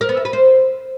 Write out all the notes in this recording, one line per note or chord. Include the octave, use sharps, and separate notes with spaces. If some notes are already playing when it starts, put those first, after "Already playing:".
A#4
B3
E5
B4
C5